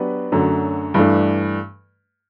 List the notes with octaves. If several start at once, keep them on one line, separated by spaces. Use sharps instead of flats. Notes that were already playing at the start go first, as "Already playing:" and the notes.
Already playing: F#3 B3 D4 G4 B4
F#2 D3 F#3 A3
G2 E3 A3 D4